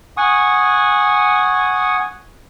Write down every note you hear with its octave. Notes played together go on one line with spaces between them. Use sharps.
F#5 G#5 C#6 D#6